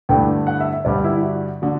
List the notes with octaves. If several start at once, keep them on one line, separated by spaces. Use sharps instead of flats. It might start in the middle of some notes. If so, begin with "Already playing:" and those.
G2 D3 A3 E4 G5
F#5
E5
E5
G2 D3 G3 D5
E4
F#4
D3 F#4